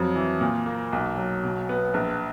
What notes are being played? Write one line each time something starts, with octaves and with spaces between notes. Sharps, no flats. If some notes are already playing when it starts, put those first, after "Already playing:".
Already playing: F2 F#3
E3
A#2
A#3
B1
F#3
B2
B3
A#1